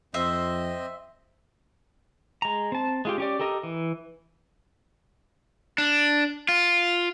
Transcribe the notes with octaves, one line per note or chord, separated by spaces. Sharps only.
F2 C4 C5 D#5 E5
G#3 A#5
C4 A5
G#3 F4 G4
C#4 G4 D5
G4 A4 A#4 D#5
E3
D4
F4